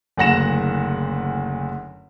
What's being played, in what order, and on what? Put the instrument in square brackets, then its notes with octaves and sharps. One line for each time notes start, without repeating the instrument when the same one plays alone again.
[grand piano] F#1 D2 F#5 A#6 E7